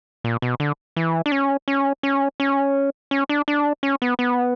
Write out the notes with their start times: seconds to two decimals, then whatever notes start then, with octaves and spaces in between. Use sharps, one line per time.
0.24 A#2
0.42 B2
0.60 D3
0.96 E3
1.26 D4
1.32 C#4
1.68 C#4
2.03 C#4
2.40 C#4
3.11 C#4
3.29 D4
3.48 D4
3.83 C#4
4.02 B3
4.19 B3